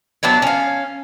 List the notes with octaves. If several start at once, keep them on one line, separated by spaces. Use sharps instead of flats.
F#3 B3 D4 E4
C#4 F5